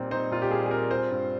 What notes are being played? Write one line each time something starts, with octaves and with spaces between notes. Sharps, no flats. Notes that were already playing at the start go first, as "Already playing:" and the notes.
Already playing: A#2 G3 C4 D#4
D#4 C5
A#2 F4
G4
G3 G#4
G#4
C4 A#4
F4 C5
G2